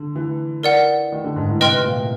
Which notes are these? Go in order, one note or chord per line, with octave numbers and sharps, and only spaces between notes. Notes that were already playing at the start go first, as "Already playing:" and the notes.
Already playing: D3
E3
A#4 D5 F#5
D#3
D3
G#2
A2
C3 B4 D#5 G5 C6 F6
A#2